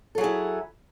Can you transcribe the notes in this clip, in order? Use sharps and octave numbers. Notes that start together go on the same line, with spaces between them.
F#3 E4 G#4 A4